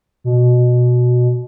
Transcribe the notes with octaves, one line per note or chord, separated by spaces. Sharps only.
B2